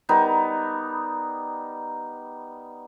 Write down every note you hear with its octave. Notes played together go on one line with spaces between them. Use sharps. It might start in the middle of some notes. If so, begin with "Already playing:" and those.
G3 B3 D#4 A#4